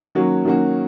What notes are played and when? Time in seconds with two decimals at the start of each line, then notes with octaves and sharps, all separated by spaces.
0.15 D#3 F#3 A#3 C#4 F#4
0.45 D#3 F#3 A#3 C#4 F#4